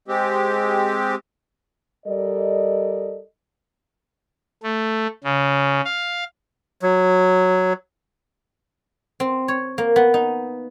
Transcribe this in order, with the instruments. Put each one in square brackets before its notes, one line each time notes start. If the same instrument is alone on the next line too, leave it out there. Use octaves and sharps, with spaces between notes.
[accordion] G#3 C4 G4
[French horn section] G3 A4 A#4 D5 D#5
[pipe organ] A3
C#3
F5
[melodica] F#3
[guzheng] C4
C#5
A#3
B3
D#4